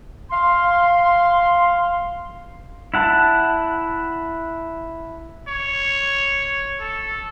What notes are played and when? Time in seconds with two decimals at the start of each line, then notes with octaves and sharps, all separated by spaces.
0.32 F5 C6
2.94 E4 F#5 A5
5.48 C#5
6.80 A4